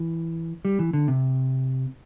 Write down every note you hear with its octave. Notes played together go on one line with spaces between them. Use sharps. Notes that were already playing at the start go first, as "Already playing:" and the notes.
Already playing: E3
G3
E3
D3
C3